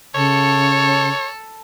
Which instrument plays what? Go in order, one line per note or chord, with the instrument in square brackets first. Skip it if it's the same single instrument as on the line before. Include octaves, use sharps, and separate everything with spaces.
[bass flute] C#3 [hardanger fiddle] A4 [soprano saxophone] C#5